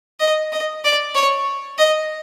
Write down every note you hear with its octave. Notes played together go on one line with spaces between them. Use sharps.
D#5
D#5
D5
C#5
D#5